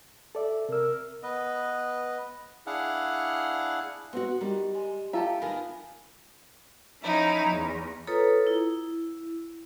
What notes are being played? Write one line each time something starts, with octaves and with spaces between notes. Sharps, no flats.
A4 D5 E5
C3 A#4 E6
B3 B4 D#5
D4 E4 G#4 F5 F#5
B3 C4 F#4 F#5
D#3 G3
G#3
F4 G4 A4 E5 A#5
D#3 B3 G#4 A#4
F3 C#4 D#4 E4
E2
F4 A4 B4 C#5 A#5 D#6
E4